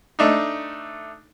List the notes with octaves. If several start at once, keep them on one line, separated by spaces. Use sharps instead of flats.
A3 D4 D#4